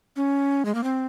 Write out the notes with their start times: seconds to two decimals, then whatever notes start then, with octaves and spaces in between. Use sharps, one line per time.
0.16 C#4
0.65 G#3
0.75 A#3
0.84 C4